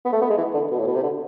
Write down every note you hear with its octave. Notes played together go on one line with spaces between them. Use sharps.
B3
A3
B3
G#3
E3
D3
B2
A2
B2
C3
D3